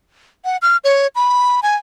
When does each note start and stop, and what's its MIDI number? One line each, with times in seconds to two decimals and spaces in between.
0.45 0.57 78
0.62 0.77 89
0.84 1.07 73
1.15 1.60 83
1.63 1.76 80